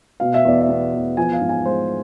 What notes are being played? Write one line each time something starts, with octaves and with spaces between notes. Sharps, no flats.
B2 F5
E5
E2 D5
E5
B3
E2
F3 G#5
F5
G#2
G#5
G#3 C5